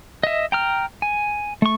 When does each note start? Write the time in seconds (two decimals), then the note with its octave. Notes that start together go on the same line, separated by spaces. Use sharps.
0.23 D#5 E5
0.52 G5 A#5 F6
1.02 G#5
1.62 A3 C#6